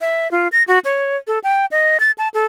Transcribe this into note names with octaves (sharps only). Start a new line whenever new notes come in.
E5
F4
A#6
F#4
C#5
A4
G5
D#5
A6
A5
A4